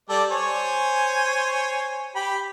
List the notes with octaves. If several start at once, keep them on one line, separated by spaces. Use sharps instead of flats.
G3 A4 D5
C5 C#5 G#5
G4 B5